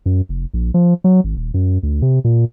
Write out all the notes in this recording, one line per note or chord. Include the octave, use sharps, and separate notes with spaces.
F#2
F1
A#1
F3
F#3
G#1
D#1
F#2
D2
C3
A#2